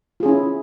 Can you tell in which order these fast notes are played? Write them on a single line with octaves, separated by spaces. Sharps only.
F4 G#4 C#4 E4